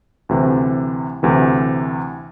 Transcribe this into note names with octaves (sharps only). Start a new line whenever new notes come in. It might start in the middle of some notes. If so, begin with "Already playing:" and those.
D2 C3 E3
D2 C3 E3